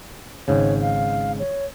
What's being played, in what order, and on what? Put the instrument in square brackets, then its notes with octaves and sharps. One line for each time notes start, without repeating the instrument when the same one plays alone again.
[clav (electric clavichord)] G#1 G#2 C#3 [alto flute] C#5
[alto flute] F5
C#5